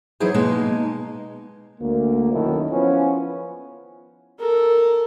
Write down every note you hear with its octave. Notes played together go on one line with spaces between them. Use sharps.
E3 F#3 D#4 E4 G#4 C5
B2 G#3 A#3 D#4
D2 A#3
B1 F#2 D#3 E4 A4
F3 B3 C#4 E4 F4
A4 A#4